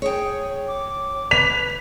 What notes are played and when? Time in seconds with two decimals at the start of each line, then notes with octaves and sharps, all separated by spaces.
0.02 G#4 C#5 G5
0.68 D6
1.31 B4 B6 F7